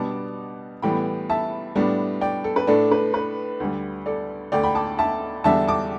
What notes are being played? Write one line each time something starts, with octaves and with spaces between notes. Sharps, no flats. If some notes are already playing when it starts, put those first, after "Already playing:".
Already playing: B2 G3 B3 D4 A5 D6
A2 E3 G3 B3 G5 B5
E5 A5
A2 G3 B3 D4
D5 G5
A4
B4
A2 A3 D4 A4 D5
B4
B4
D2 D3 G3
A4 D5
D2 D3 A3 D5 G5
G5 B5
A5 D6
E5 A5
E2 D3 G3 D4 E5 A5
A5 D6